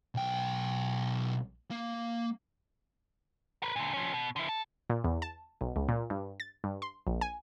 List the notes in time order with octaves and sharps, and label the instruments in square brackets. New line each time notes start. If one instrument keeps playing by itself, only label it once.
[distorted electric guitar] B1 G5
A#3
[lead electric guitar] A#4 B4
A#2 D3
F3 C#4
B2
D3 E4
A4
[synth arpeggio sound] A#2
E2
A5
B1
C#2
A#2
G2
A6
G2
C6
A#1
G#5